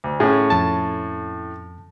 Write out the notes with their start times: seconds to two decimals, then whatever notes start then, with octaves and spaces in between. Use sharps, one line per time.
0.04 D2
0.20 A2 C#4 G#4
0.50 F2 A5